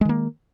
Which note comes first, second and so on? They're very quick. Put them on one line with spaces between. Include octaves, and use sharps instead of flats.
G#3 D#3 A#3